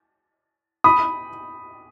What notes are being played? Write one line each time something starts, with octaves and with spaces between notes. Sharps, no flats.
B5 D#6